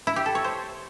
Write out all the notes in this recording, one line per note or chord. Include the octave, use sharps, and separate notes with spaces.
E4
G4
A4
C#5
C5